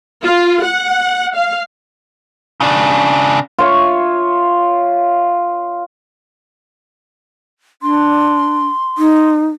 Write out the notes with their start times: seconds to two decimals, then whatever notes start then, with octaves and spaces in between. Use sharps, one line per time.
0.24 F4
0.63 F#5
1.35 F5
2.60 C#3 D4
3.59 F4 C#5 E5
7.82 D4 C6
8.98 D#4